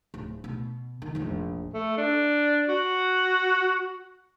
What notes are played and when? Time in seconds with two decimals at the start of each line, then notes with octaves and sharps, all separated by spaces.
0.14 D1
0.44 B2
1.02 D#3
1.15 F1 A#1
1.74 A3
1.98 D4
2.69 F#4